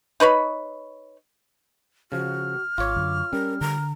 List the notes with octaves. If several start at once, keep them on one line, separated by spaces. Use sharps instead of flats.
D#4 B4 C#5 B5
C#3 F3 F#4 F6
G#1 F4 C#5 D6
F#2 D3
G3 C#4 A#4
D3 A#5